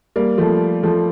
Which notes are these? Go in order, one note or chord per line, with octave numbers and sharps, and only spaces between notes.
G3 A#3
F3 A3
F3 A3